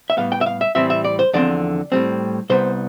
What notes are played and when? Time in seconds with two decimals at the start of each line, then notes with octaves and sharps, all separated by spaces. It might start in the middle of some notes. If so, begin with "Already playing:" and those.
0.10 E5
0.17 A2 G3 B3 F5
0.32 G5
0.41 E5
0.46 F5
0.61 E5
0.75 A2 E3 G3 C4 E5
0.90 E5
1.04 D5
1.19 C5
1.33 E2 D3 F3 C4 D5
1.92 A2 G3 C4
2.50 C2 C3 G3 B3 C5